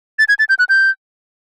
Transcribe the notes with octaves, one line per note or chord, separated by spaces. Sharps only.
A6
G#6
A6
G6
F#6
G6